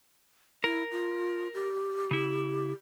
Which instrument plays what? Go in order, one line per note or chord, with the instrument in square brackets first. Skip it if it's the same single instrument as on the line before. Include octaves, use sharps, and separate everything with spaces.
[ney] E4 [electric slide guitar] A#4
[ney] F4
G4
[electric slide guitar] C#3 E4